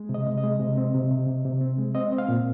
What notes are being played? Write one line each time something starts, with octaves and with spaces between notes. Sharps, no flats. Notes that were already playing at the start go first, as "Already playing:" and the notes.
Already playing: G#3
C3
D#5
C3
D#5
G#3
C3
C4
C3
C3
C3
C3
C4
G#3
C4 D#5
C4
F5
A#2